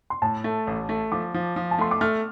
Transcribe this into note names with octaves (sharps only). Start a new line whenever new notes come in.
C6
A2 A5
A3
A1
A3
F3 D6
F3
F3
A5
A3 C6
D6
A3 F6